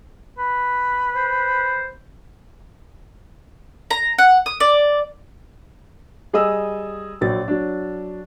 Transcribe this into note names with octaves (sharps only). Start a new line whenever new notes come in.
B4
C5
A#5
F#5
D#6
D5
G3 G#4 D#5 D#6 E6
A#1 F#3 A6
F#3 D4